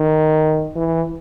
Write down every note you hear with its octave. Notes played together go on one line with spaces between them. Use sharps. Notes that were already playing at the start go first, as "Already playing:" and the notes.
Already playing: D#3
E3